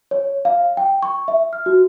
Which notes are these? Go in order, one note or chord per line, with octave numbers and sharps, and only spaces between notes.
C#5
F5
G5
C#6
E5
F6
F#4